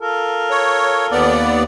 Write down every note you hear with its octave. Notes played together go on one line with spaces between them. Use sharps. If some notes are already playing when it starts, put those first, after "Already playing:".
F4 A4 A#4
C#5
D#2 B3 D5